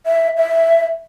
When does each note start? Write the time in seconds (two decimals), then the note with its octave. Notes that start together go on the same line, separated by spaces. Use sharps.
0.06 E5
0.37 E5